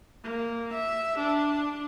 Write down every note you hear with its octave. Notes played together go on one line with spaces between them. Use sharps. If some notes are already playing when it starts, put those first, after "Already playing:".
A#3
E5
D4